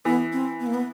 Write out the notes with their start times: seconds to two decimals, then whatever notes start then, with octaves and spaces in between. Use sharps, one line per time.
0.05 E3 B3
0.32 C4
0.60 B3
0.67 A#3
0.74 B3